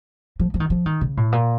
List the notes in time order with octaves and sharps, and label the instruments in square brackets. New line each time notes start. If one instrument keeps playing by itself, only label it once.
[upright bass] F3
F3
D#3
F3
D#3
C#3
A2
A#2